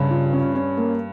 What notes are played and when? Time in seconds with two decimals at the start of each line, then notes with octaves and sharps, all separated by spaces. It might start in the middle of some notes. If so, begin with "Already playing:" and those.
Already playing: G2 C#3
0.10 F4
0.33 C#4
0.55 C#4
0.77 A#3